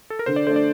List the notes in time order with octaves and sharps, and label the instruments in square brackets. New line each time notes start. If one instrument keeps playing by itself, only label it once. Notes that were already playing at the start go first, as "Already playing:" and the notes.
[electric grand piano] A4
A#4
[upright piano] D3 [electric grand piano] C5
[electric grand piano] D5
[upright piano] A3 D4 [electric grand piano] C5
[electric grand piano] D5